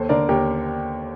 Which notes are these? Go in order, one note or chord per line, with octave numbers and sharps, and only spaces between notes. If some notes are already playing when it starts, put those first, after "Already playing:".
Already playing: D#2 A4 C5
D3 A#4 D5
D#2 G4 A#4